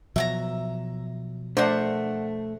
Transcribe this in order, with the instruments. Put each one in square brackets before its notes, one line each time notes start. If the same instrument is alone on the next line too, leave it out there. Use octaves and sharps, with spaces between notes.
[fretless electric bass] B2 F3 F#3 [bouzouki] E5 F#5 A#5
[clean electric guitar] A3 [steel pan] D4 C5 [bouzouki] A#4 F#5